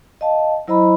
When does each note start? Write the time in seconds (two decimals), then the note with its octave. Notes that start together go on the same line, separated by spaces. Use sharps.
0.21 D#5 F5 A5
0.68 F#3 E4 C5 D#5 A#5 B5